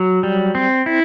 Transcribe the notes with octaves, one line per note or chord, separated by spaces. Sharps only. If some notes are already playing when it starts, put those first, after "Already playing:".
Already playing: F#3
G3
C4
E4